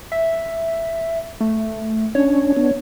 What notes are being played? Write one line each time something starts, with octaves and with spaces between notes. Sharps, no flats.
E5
A3
C#4 D4 C#5
B3 D4